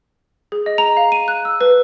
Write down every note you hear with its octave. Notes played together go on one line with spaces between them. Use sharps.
G#4
D#5
A#5
F5
D#7
F#6
E6
B4